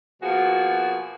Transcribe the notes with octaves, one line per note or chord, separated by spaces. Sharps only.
B2 F3 A#3 F#4 G#4